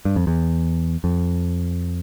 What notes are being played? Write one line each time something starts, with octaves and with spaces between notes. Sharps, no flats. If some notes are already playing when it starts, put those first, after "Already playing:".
G2
F2
E2
F2